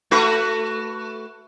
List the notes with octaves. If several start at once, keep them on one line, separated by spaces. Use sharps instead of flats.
A3 F#4 B4